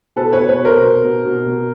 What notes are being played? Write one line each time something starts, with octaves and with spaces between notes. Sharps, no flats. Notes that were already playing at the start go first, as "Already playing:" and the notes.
B2 A4 B4
B4 C#5
B2
B4 C#5
B2
A#4 C5
B2
B2
B2
B2